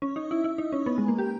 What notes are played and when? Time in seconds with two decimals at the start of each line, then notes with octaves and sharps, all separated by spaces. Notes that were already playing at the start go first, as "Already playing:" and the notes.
0.02 C#4
0.16 D#4
0.31 E4
0.44 E4
0.58 D#4
0.72 C#4
0.86 B3
0.98 G#3
1.08 A#3
1.18 G4